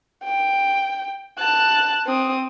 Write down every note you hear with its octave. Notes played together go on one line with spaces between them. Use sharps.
G5
A5 F#6
C4 D#6